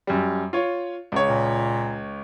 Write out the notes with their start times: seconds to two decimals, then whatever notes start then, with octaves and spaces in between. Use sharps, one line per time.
0.07 F#2 G3
0.53 F4 C#5
1.12 C#2 C#5
1.27 A#2